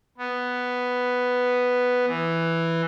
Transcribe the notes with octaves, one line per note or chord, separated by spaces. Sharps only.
B3
E3